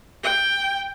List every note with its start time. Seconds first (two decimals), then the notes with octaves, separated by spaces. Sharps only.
0.23 G5